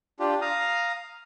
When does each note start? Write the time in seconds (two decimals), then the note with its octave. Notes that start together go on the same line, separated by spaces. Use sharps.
0.19 D4 F4 G4
0.41 F5 A#5 D#6